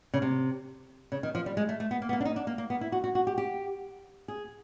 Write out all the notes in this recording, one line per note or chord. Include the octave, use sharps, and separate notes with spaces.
C#3
C3
C#3
D#3
F3
G3
G#3
A3
A3
B3
A#3
B3
A#3
D4
D#4
D4
A#3
A#3
B3
E4
F#4
F#4
F#4
G4
G4
G#4